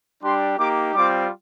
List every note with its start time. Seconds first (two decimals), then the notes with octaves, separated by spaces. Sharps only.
0.22 G3 D4 G4 C6
0.58 A#3 D#4 G4 D6
0.95 G3 C4 F4 D6